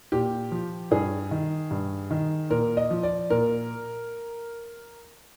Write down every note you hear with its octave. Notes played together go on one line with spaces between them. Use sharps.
A#2 G4
F3
G2 G#4
D#3
G2
D#3
A#2 A#4
D#5
F3
D5
A#2 A#4